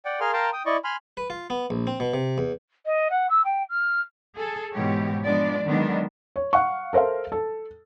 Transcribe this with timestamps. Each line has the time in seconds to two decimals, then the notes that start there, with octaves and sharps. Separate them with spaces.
0.05 D5 F#5 G5
0.20 G#4 A#4 F5 G#5 C6 F6
0.33 A#4 F5 G5 A5 A#5 C6
0.53 G5 D#6
0.66 E4 D5 D#5 C#6
0.84 G#5 B5 C6 F6
1.17 B4
1.30 F4
1.50 B3
1.70 A#1
1.87 C4
2.00 B2
2.14 C3
2.38 E2
2.85 D#5
3.10 F#5
3.29 E6
3.44 G5
3.69 F6
4.37 G#4 A4
4.73 G#2 B2 E3 G#3 G4 C#5
5.25 F3 G#3 B3 D4 D5
5.65 D3 D#3 F#3 G#3 B3 D4
6.36 C#5
6.53 F5 F#5 C#6
6.93 A4 A#4 C5 E5 F5
7.32 A4